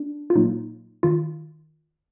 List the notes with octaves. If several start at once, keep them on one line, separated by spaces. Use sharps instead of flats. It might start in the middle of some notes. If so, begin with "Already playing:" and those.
Already playing: D4
F4
A#2 F#3 A#3 D#4
D#3 F4